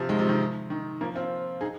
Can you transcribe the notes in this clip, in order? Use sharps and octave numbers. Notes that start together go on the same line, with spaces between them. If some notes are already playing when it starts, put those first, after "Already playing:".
Already playing: C3 F3
D#3 G#3
C3 F3
D#3
D#3
F3 A#3
C4 F4
D#4 G#4